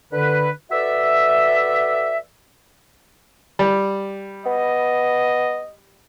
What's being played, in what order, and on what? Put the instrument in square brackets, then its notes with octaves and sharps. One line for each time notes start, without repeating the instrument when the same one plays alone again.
[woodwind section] D3 B4
F#4 A4 B4 D5 E5
[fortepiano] G3
[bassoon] B3 [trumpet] D#5